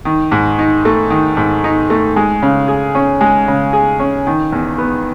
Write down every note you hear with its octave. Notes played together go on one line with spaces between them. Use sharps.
D#3
G#2
D#4
A3
D#3
G#2
D#4
A3
G#3
C#3
G#4
C#4
G#3
C#3
G#4
C#4
D#3
E2
B3